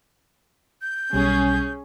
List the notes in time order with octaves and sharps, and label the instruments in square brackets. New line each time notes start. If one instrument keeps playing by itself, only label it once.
[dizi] G6
[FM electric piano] B1 B2 G3 [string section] C#4 G#4